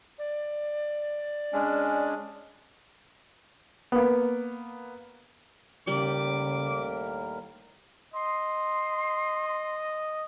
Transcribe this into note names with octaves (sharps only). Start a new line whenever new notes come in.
D5
G#3 C#4 D4
A#3 B3
D#2 A2 C#3 G3 A#4 D6
D#5 C6